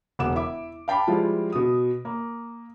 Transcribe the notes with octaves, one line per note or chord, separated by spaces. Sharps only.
E1 F#5 D6 E7
E4 E5 D6
F5 G5 A5 B5 D6
F3 G3 G#3 E4 F4
B2 D#6
A#3